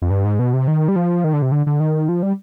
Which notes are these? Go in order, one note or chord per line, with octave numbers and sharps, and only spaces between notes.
F2
G2
G#2
B2
C3
D#3
G3
F3
D#3
D3
C3
D3
D3
D#3
F3
G3